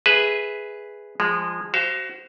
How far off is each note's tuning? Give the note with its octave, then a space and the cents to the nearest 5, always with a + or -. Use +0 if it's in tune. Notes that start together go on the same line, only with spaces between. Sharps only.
G#4 +0 B4 +0 E5 -5
F3 +0 G#3 -20
F#4 +25 C5 +0 F5 -25